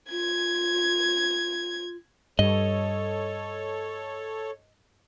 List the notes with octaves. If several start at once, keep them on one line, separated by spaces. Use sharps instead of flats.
F4 G#6
G2 A4 C#5 D#5